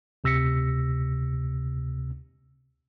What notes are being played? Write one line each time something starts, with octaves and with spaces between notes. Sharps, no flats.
D2 C3 E6 A#6 B6 C#7